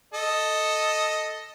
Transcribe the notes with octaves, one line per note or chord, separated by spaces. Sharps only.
A4 D#5